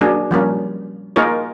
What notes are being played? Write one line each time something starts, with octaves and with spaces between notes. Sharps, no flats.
F#3 A#3 D4 G#4
F3 G3 A#3 C#4
A#3 D#4 F4 G#4 A#4 C#5